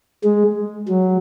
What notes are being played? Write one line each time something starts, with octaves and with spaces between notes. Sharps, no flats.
G#3
F#3